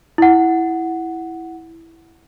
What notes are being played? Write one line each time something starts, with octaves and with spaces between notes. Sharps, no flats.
E4 F#5